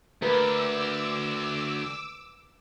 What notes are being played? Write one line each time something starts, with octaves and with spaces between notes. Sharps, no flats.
D2 A#4 B4 D6 E6